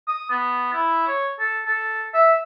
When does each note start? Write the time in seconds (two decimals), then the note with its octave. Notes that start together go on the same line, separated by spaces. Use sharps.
0.08 D#6
0.30 B3
0.73 E4
1.07 C#5
1.39 A4
1.66 A4
2.14 E5